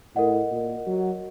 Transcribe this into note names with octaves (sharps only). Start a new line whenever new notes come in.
A2 A#4 D#5 F#5
A#2
F#3